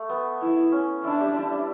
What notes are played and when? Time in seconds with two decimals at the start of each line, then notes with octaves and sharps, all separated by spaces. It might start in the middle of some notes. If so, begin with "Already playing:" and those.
Already playing: A3
0.09 B3
0.41 E4
0.72 C#4
1.04 D4 E4
1.20 G3 G4
1.36 E4
1.52 D4